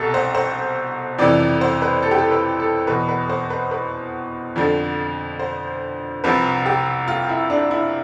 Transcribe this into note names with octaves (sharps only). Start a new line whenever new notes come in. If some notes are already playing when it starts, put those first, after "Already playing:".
Already playing: C2 B2 G4 A4
C5
C5
F2 C3 E3 D5
D5
C5
B4
A4
G4
A4
B4
A4
E2 B2 B4
B4
C5
B4
B4
F2 D3 F3
C5
C2 C3 F3 B4
G4
F4
E4
D4
E4